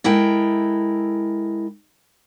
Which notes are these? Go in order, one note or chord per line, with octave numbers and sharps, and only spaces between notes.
G#3 E4 A4 A#4 G5